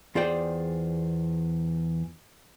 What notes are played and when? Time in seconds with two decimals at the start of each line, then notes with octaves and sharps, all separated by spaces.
0.15 E2 F4 G#4 C5 D5 G5